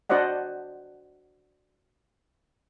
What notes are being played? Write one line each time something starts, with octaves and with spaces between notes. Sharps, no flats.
D4 F#4 C5 D5 D#5 F#5